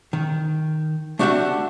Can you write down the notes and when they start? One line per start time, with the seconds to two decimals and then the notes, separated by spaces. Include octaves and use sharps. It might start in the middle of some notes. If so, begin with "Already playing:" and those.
0.13 D#3
1.19 A3 D4 F#4 G4 E5 F#5